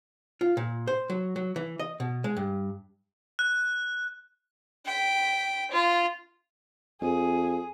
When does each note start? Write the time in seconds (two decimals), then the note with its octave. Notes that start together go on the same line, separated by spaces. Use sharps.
0.41 F4
0.57 A#2
0.88 C5
1.10 F#3
1.36 F#3
1.56 E3
1.80 D#5
2.00 B2
2.24 G#3
2.37 G2
3.39 F#6
4.85 G5 B6
5.72 F4
7.02 F2 G#4